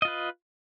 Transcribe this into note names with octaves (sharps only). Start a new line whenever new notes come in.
F4 B4 D#5